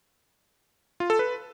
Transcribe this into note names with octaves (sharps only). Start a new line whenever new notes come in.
F4
A4
B4